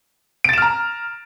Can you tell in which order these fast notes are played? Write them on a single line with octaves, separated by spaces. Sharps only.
D7 A6 E7 F6 A#5